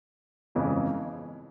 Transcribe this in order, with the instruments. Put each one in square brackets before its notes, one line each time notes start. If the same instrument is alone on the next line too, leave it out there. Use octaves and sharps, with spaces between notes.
[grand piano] G1 F2 C#3 E3 G#3